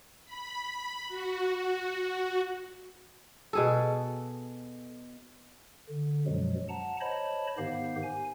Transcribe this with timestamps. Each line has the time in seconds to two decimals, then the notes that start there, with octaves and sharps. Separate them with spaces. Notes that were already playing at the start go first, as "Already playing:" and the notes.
0.25 B5
1.09 F#4
3.53 B2 G#4 A4
5.89 D3
6.26 F#2 B2 F3 F#3 G#3
6.69 F#5 A5 A#5
7.01 C5 C#5 D#5 A5 B5
7.58 G#2 D#3 B3 G4 C5 F5
8.03 G#5